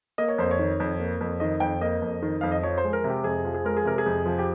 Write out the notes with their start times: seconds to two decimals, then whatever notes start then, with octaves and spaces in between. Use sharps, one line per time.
0.18 A#3 D#5
0.29 C#5
0.38 F2 C5
0.51 C#5
0.59 D#3
0.80 F2
1.00 A#3
1.21 F2
1.40 D#3 D#5
1.60 F2 G5
1.81 A#3 D#5
2.02 F2
2.22 D#3
2.41 F2 F5
2.52 D#5
2.63 F3 C#5
2.78 C5
2.84 G#3
2.93 A#4
3.04 C3
3.09 G4
3.24 F2 G#4
3.45 F3
3.54 G#4
3.65 G#3 A#4
3.77 G#4
3.85 C3 A#4
3.98 G#4
4.06 F2
4.26 F3
4.38 G4